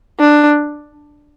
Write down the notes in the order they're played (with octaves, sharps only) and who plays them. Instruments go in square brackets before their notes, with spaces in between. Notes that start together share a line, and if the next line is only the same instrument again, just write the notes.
[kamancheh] D4